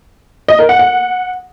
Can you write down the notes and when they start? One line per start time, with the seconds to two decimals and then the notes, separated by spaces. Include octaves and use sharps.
0.48 D#5
0.59 A#4
0.69 F#5
0.79 F#5